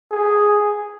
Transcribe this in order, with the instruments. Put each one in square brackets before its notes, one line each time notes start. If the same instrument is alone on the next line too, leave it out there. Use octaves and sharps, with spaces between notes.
[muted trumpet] G#4